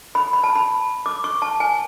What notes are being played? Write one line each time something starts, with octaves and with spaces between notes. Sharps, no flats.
B5
B5
A5
B5
D6
C#6
A5
G#5